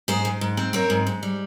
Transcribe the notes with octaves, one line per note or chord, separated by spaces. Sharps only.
G#2 G#4 C5
G#2
G#2
C4
C4 A#4 C#5
G#2
G#2
G3